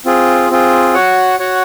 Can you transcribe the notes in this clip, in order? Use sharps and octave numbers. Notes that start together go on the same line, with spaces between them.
C4 F4 G#4
C4 F4 G#4
F#4 C#5 F#5
F#4 C#5 F#5